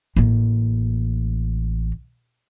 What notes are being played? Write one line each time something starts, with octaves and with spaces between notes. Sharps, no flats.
A1 A#3